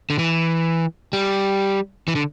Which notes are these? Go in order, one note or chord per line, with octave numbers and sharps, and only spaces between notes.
D3
E3
G3
E3
D3